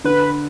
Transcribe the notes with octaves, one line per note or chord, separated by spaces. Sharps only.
D3 B4